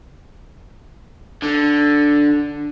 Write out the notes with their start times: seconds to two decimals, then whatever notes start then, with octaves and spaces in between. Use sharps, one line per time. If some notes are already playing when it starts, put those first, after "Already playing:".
1.43 D3